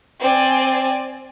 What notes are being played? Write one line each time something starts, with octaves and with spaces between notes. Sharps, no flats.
C4 D5 G#5